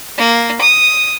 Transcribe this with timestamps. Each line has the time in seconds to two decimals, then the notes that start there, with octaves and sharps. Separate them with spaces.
0.18 A#3
0.61 D#6